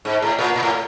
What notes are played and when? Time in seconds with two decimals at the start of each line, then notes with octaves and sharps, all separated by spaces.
0.05 G#2
0.22 A2
0.38 A#2
0.56 A#2
0.63 A2